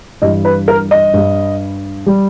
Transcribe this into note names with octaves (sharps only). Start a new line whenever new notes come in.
G2 E3 G3 D#5
B4
A#4
D#5
G2 G3
G3